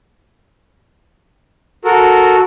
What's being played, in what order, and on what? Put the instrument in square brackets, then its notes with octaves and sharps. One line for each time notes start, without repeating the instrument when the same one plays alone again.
[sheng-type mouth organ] F#4 A4 A#4